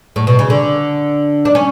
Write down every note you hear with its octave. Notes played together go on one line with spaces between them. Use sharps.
A2
B2
C#3
D3
D4
C#4